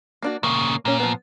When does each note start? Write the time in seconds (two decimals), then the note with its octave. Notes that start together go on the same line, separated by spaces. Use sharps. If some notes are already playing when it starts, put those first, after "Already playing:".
0.22 A#3 D4 F#4
0.43 A#2 C#3 A#3
0.85 A#2 A#3 C#4
1.00 F3 B3